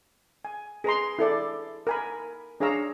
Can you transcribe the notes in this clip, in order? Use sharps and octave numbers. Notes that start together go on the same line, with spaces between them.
G#5
G#4 B4 A#5 C6
E4 A4 D5
A#4 G#5 B5
D4 G#4 C#5 F5 A#5 E6